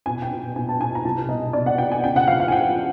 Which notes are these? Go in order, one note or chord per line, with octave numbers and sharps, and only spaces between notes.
B2 G#5
G5
B2
B2 G#5
A5
B2 G#5
A#5
C2 A5
B2 D#5
B2 D5
F#5
B3 G5
G#5
C#3 G5
F#5
F3 F5
F5
G#5
F3 G5